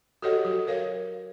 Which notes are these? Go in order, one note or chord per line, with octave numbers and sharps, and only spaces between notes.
F#4 G4 A4 C#5 D#5 F#5
F#3 F#4
A#4 C#5 F5